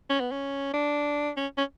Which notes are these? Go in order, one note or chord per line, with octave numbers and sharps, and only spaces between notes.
C#4
B3
C#4
D4
C#4
C#4